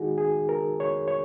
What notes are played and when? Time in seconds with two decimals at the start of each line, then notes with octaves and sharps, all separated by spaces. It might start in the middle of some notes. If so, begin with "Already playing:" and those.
Already playing: D#3 G#3 D#4 F#4 G#4
0.18 G#4
0.49 A#4
0.80 C#5
1.08 C#5